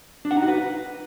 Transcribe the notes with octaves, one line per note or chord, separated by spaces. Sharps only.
D4
F#5
D#4
F#4
B4